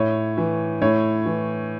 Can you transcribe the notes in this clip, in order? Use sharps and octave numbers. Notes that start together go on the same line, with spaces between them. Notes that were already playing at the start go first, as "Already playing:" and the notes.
Already playing: A2 C#5
E3
A2 C#5
E3